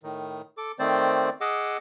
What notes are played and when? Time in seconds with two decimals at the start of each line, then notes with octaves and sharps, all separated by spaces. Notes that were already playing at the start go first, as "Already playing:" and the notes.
0.03 A2 D#3
0.57 A4 D6
0.79 D#3 A3 C4 C5 D5
1.41 G#4 D#5 F#5 D6 E6